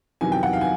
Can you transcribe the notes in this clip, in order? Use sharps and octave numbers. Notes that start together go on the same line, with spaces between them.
E2 C3 D#3 F#3 G#5
G5
F#5
F5
G#5